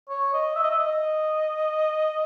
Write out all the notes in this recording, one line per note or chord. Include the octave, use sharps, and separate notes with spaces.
C#5
D#5
E5
D#5
E5
D#5